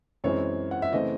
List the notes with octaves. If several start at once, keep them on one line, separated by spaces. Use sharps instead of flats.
F#2 E3 G#3 C4 C#5
F#5
E5
C#3 E3 A3 C4 D#5